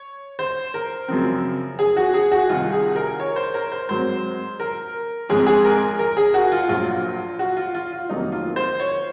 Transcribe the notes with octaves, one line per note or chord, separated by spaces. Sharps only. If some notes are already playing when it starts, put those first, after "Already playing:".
Already playing: C#5
C5
A#4
F#2 C#3 F3 C4
G#4
F#4
G#4
F#4
C2 C3 D#3 F4
G#4
A#4
C#5
C5
A#4
C5
G#2 F#3 C4 C5
A#4
G#2 F3 C4 G#4
G#4
A#4
A#4
G#4
F#4
F4
A#1 A#2 F#3 F4
F#4
F4
F4
F4
F1 F2 D#3 F#3 A#3 D#4
F4
C5
C#5